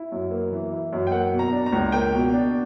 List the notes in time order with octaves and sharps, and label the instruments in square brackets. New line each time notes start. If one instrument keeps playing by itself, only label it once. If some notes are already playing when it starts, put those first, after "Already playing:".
Already playing: [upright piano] E4
F#2
A#3
E3
E4
F#2
G5
A#3 F#5
B2
A#5
D4
A#5
C#2
A#3 G5
B2
D4